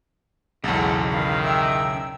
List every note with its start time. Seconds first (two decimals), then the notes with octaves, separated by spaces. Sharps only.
0.64 B1 E2 C#3 G#3 A4 F#5
1.11 D#3 F5 B5
1.43 E5 G5 E6